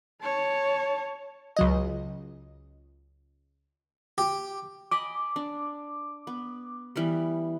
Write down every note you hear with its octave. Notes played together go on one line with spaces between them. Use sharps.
C#5 A5
C#2 F#3 D#5
G4
D#5 G#5 B5 D6
D4
B3
E3 G3 B3